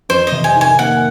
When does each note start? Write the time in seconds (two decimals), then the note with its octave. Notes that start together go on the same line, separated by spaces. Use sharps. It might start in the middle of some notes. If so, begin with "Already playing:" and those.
0.09 F2 C5
0.27 D#5
0.32 C3
0.44 G#5
0.56 D#3 G#5
0.78 A#3 F#5